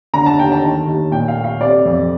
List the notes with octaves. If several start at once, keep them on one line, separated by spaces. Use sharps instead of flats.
D3 A#5
A5
D#2 G5
A5
D#3
D#2
A#2 G5
F5
A3
F5
C3 D5
F2